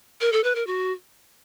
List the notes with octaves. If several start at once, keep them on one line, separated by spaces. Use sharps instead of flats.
A#4
A4
B4
A#4
F#4